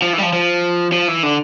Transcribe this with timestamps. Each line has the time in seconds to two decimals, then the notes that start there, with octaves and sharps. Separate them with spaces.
0.02 F3
0.13 E3
0.18 G3
0.23 F3
0.33 F3
0.92 F3
1.08 E3
1.23 D3